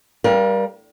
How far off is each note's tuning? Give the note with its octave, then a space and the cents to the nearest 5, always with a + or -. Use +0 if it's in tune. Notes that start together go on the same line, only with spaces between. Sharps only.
G3 +5 A#4 +40 F5 -15